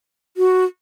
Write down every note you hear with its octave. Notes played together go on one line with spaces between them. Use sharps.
F#4